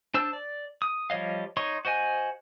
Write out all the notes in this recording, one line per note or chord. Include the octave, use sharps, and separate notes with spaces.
D4 C5 A5 E6
D5
D#6
F3 G3 C#5 D#5 F5
D#4 C#5 D#5 C6 C#6
F#4 C5 D#5 G#5